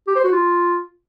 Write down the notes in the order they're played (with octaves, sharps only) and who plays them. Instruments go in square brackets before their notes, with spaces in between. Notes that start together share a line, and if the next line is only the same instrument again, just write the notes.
[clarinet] G4
C5
F#4
F4